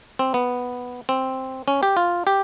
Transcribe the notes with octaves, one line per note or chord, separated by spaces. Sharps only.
C4
B3
C4
C#4
G4
F4
G4